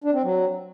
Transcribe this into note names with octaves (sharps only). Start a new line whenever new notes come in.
D4
C4
F#3